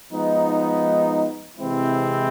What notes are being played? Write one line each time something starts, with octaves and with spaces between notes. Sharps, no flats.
F3 G#3 B3 D#4
C3 E3 G#3 C4 E4